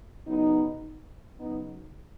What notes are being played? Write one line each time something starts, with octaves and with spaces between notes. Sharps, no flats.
C#3 F#3 B3 D#4
C#3 F#3 B3 D#4